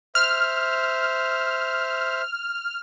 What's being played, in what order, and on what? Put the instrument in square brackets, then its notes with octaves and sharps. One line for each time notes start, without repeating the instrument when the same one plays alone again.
[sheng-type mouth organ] C5 E5 [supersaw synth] F6